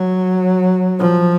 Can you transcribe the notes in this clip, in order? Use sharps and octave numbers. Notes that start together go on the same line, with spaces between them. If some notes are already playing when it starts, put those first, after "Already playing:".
Already playing: F#3
F3